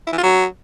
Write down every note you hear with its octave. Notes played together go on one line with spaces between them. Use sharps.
E4
E3
F4
F#3